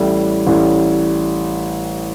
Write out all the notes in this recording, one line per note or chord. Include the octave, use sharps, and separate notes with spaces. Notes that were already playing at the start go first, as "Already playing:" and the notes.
Already playing: A1 A2 G3
A1 A2 G3